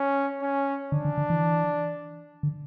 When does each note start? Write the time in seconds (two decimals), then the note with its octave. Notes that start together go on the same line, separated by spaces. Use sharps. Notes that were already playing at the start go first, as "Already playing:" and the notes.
Already playing: C#4
0.42 C#4
0.92 D3 D4
1.05 D3
1.18 D3
1.30 E3
2.43 D3